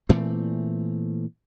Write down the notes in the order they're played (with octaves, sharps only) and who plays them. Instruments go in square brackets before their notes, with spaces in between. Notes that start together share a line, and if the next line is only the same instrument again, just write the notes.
[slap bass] A#2 E3 A3 C4